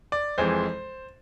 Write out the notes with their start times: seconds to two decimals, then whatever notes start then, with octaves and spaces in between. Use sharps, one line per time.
0.12 D5
0.38 F2 E3 G#3 C5